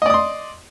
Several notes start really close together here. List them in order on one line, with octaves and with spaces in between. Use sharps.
D#5 D5 D#6 C6